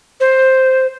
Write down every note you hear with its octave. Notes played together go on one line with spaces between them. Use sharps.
C5